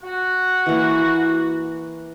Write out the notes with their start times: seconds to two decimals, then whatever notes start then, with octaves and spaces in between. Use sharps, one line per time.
0.02 F#4
0.66 E3 A#3